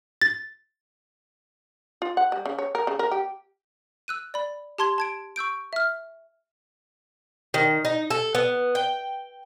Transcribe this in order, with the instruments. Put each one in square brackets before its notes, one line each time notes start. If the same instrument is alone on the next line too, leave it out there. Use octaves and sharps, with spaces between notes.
[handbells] A6
[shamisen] F4
F#5
G3
C#3
C#5
A#4
C#3
A#4
G4
[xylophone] E6 F#6 D#7
D5 B5
G4 A5 C6 G#6 G7
A5 G#6 D7
C#6 E6 G6 D7
E5 F6
[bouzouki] D#3
D#4
A4
B3
G5